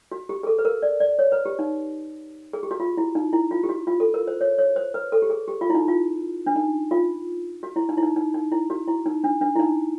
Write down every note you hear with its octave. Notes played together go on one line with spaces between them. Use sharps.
F#4
G4
G#4
A4
B4
A#4
D5
D5
C#5
B4
G4
D#4
G#4
G4
F#4
F4
E4
D#4
E4
F4
G4
F#4
F4
A4
A#4
C5
C#5
C#5
C5
B4
A4
G4
G#4
G4
F4
E4
D#4
F4
D4
D#4
F4
F#4
E4
D#4
E4
D#4
D#4
D#4
E4
F#4
E4
D#4
D4
D4
E4
D#4